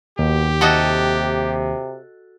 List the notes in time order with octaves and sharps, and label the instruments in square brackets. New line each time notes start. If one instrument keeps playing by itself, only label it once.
[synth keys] D#2 [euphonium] B2 [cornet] G4
[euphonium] C3 [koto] F#4 A4 D#5